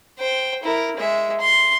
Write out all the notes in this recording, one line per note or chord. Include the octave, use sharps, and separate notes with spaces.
C5 G5
E4 A#4
G#3 E5
C6